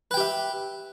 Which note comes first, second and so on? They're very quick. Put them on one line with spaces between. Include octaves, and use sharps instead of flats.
B4 G5 G4 E5